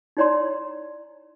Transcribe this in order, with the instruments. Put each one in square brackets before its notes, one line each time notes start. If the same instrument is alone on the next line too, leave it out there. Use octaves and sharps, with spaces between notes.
[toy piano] D#4 E4 C#5 D5 A#5 C6